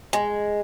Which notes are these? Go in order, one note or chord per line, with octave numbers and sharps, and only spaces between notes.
G#3